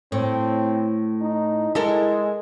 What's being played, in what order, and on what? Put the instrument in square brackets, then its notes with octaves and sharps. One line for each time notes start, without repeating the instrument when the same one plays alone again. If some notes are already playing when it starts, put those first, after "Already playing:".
[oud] A2 [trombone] C4
[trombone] D#4
[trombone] G#3 [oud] E4 A4 A#4